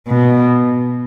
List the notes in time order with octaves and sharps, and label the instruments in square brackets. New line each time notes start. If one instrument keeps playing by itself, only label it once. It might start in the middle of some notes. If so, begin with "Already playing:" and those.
[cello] B2